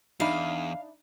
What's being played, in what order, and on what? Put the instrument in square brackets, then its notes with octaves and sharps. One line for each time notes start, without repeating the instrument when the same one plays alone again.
[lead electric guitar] E2 [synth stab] D4 D#4 [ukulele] E5 B5 [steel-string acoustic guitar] F5